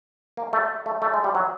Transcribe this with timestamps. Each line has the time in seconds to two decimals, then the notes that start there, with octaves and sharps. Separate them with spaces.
0.37 A#3
0.53 A3
0.86 A3
1.02 A3
1.14 G#3
1.24 G3
1.35 F#3